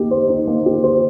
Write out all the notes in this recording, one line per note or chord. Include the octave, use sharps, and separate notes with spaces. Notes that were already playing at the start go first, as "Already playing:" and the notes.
Already playing: A#3 D#4 G4
C5
D#4
A#3
G4
C5